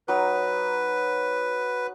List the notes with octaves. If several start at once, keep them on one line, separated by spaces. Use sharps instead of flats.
F#3 D#4 B4 A#5